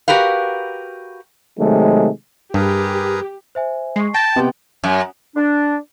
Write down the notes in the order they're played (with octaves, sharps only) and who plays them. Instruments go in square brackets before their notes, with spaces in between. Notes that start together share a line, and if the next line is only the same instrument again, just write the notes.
[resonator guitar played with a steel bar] F#4 G4 A#4 B4 F5
[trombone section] C3 D#3 F#3 G#3 A3
[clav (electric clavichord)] G2 [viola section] G4 [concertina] G#4 A#4 B4
[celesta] C5 E5 G#5
[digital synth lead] G#3 [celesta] C#6 C7
[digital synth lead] G5 [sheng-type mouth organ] A5 [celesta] A#6
[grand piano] C3 B3 G4 [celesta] D#5 C6
[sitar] F#2
[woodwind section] D4